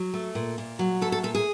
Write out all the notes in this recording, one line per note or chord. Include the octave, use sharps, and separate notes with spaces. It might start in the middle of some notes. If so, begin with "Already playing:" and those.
Already playing: F#3
A3
A#2
A#2
F#3
A3 A4
A4
A#2 A4
G#4